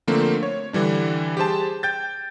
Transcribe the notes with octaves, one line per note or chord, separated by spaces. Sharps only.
D3 F3 A3 A#3 C4
C#5
D3 E3 G3 D4
G4 G#4 C5 A5
G5 G6 A6